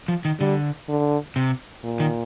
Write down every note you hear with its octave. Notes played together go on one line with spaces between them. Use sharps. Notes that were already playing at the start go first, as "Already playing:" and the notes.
F3
D#3
D3 G3
D3
C3
A#2
D#3